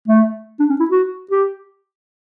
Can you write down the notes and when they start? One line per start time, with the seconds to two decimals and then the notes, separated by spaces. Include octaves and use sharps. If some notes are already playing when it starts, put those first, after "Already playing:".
0.08 A3
0.60 D4
0.70 C#4
0.80 E4
0.91 F#4
1.31 G4